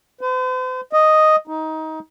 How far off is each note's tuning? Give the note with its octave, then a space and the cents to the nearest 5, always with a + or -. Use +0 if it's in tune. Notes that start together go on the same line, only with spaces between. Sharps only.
C5 -45
D#5 +0
D#4 +20